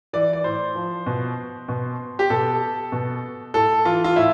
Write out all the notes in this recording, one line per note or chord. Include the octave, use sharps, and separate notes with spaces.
E3 D5
D5
A2 C5
F3
B2
B2
G4
B2 A4
B2
A2 A4
E3 F4
F4
A2 E4